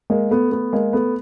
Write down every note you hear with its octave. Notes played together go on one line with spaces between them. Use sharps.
G#3 A#3
A3 B3
A3 B3
G#3 A#3
A3 B3